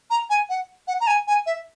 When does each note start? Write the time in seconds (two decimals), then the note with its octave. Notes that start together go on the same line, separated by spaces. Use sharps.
0.10 A#5
0.30 G#5
0.49 F#5
0.88 F#5
1.01 A#5
1.07 G#5
1.27 G#5
1.46 E5